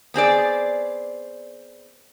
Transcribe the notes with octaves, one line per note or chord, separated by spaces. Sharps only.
B3 C4 G#4 D5